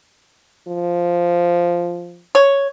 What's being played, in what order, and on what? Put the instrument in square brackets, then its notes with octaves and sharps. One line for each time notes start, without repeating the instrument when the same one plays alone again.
[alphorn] F3
[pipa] C#5